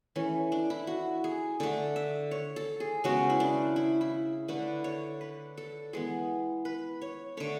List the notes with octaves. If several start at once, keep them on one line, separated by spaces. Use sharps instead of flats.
E3 A3 C#4
D4
E4
F#4
G#4
D3 A3 A4
E5
C#5
A4
G#4
C#3 G#3 B3 F#4
E4
D4
E4
E4
D3 A3 B4
C#5
B4
A4
E3 G#3 B3 G#4
B4
C#5
D3 A3 C#5